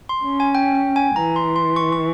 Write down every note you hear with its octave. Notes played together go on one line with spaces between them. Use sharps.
C6
C#4
G#5
G5
G5
G#5
E3 A#5
C6
C6
C#6
C#6